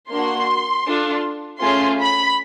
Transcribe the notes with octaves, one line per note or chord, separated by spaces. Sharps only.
A#3 D4 F#4 C6
D4 F4 A4
A3 C#4 F4 G#4 C6
B5